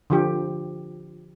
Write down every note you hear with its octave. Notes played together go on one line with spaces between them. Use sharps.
D3 F3 G4